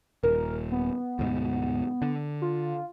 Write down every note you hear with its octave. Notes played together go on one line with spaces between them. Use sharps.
D#1 A#4
B3
D2 G#2 B2
D3
F4